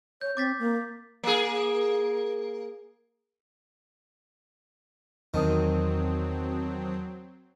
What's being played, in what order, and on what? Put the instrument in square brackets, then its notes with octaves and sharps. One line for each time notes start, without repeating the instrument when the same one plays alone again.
[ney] C#5 [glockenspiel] G6
[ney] C4 [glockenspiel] D6 A6 B6
[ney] A#3
[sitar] A#3 G#4
[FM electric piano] E2 A5 D#6 [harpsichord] D#3 [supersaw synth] F#3 C4